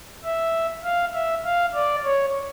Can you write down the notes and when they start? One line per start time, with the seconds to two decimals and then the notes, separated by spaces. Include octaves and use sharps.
0.24 E5
0.84 F5
1.13 E5
1.44 F5
1.75 D5
2.04 C#5